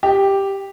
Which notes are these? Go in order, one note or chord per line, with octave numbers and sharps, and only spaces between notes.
G4